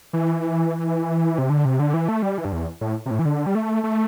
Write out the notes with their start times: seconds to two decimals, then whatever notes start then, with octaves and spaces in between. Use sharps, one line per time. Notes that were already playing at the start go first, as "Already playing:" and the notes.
0.13 E3
1.38 C3
1.50 D3
1.65 C3
1.79 D3
1.94 E3
2.08 A3
2.22 G3
2.38 E3
2.45 G2
2.52 E2
2.81 A2
3.06 C3
3.11 A2
3.19 E3
3.25 D3
3.46 G3
3.55 A3
3.84 A3